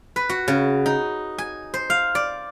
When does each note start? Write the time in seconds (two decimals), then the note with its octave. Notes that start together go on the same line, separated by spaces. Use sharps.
0.16 B4
0.29 F#4
0.48 C#3
0.86 D#4
1.38 G#5
1.74 C5
1.90 F5
2.15 D5